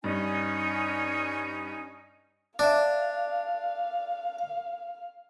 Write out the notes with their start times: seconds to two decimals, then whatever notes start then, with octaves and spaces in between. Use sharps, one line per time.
0.04 G2 C#4 D#4 G#5
2.59 D4 D5 E5 F5